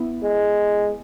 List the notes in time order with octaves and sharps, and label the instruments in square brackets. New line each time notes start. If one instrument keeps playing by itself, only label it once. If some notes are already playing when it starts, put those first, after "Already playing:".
Already playing: [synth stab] B3 E4
[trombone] G#3